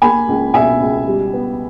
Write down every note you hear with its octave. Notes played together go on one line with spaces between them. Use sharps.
A#3 G#5 B5
C#2
B2 E5 G#5
C#2
G3
B3